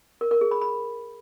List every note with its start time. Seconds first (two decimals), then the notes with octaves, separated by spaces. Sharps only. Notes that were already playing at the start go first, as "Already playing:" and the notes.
0.21 A#4
0.31 A#4
0.41 G#4
0.51 B5
0.61 B5